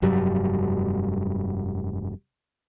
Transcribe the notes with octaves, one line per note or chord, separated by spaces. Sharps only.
F1 G2 F#3 G3